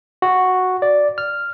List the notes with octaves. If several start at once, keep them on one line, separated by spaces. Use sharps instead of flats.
F#4
D5
F6